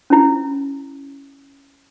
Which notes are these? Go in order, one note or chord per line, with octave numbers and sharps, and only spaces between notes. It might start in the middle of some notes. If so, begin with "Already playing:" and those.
C#4 E4